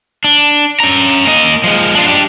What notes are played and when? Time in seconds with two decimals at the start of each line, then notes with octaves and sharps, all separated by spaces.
0.24 D4
0.80 C#4 A#5
1.27 A#3 D#5
1.64 F3 G#3
1.95 D4 F4
2.08 D4 G4